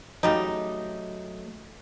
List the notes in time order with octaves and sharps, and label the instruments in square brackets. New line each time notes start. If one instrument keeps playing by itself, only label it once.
[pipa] C#3 G3 D#4 [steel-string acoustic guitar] F#3 A3